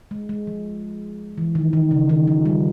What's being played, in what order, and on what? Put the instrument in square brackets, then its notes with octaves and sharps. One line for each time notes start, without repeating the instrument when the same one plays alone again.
[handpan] G#3
G#3
F3
E3
D#3
D#3
C#3
D#3
F3
G3